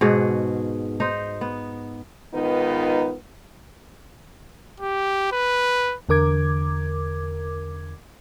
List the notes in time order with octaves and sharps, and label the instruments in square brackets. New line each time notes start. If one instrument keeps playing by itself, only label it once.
[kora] G#2 B2 F#4 G#4
D#4 C5
B3
[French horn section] G#2 D#3 B3 D#4 F4 B4
[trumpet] G4
B4
[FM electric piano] E2 D3 A#4 D6 G#6